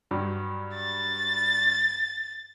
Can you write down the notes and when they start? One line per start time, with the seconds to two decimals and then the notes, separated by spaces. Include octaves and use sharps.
0.11 G2 F#3 G4
0.75 A6